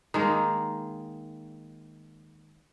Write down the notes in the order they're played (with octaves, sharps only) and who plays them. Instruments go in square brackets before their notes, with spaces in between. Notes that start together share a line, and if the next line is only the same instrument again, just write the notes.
[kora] D#3 G#3 A#3